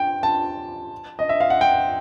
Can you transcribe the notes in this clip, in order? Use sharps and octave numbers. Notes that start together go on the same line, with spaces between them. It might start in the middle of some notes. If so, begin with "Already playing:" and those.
Already playing: G5
A5
D#5
E5
F5
F#5
G5